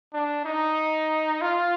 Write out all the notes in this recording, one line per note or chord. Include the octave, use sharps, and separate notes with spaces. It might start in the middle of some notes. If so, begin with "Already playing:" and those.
D4
D#4
F4